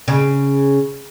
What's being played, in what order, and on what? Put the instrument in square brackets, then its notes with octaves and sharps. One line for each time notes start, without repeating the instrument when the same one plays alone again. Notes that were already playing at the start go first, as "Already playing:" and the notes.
[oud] C#3